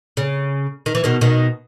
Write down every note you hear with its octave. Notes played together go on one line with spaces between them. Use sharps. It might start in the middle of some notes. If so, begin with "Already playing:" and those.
C#3
D#3
E3
B2 D#3
B2 D#3